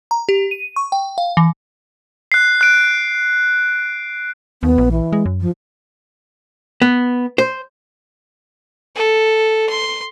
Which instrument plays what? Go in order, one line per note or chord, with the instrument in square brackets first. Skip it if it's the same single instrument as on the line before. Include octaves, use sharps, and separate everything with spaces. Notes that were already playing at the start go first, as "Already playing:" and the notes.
[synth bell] A#5
G4
D#7
C#6
G5
F5
E3
[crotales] F#6 C7
F#6 D7
[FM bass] D#2 [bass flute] B3
[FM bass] A#1
[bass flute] E3
[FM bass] G#3
F#2
[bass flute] F3
[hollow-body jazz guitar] B3
C5
[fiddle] A4
C6